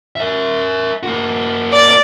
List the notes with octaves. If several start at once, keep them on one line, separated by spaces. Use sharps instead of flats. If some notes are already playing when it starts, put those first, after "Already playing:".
A#4 E5
A#3 F#4
D5